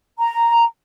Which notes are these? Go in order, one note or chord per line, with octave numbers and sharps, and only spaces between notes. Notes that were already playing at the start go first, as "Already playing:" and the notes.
A#5